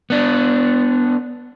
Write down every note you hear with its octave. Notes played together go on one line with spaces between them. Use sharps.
B3 D4